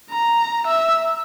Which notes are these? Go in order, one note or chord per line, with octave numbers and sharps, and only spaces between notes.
A#5
E5